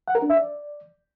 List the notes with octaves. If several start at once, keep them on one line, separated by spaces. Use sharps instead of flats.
F#5
A#4
D4
E5
D5